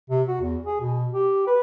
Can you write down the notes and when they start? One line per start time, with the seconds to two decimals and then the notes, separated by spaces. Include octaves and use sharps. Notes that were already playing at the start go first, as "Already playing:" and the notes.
0.10 C3
0.28 F#4
0.41 E2
0.66 G#4
0.81 B2
1.12 G4
1.47 B4